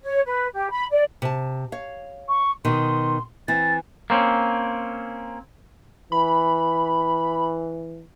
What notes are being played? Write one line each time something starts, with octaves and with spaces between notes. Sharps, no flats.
C#5
B4
G4
B5
D5
C3 A5
C#5 F5
C#6
B2 D#3 C6
E3 C4 A6
A#3 C4 C#4
E3 B5